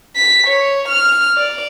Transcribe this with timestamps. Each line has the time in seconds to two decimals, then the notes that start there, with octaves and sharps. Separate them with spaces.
0.16 B6
0.47 C#5
0.88 F6
1.37 D5